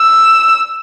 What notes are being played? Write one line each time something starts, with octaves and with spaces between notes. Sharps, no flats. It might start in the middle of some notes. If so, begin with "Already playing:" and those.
Already playing: E6